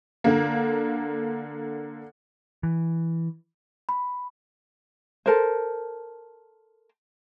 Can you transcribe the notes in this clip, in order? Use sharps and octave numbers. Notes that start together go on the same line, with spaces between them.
D3 A#3
E3
B5
A4 A#4 C5